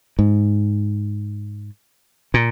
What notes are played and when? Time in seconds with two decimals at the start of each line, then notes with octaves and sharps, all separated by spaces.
0.19 G#2
2.34 A#2